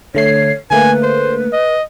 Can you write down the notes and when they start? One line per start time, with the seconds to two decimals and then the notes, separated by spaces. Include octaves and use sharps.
0.15 D3 A3 C#5 C7
0.71 D3 A3 A#3 B4 G#5
1.03 C5
1.53 D#5